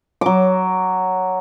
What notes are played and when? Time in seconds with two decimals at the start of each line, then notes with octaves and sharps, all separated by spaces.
0.21 F#3 D6